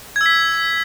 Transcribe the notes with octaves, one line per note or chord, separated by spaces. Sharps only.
E6 G#6 B6